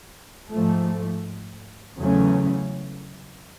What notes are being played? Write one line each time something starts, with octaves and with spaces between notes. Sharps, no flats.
G#2 F3 A3
E2 C#3 F#3 A3 C#4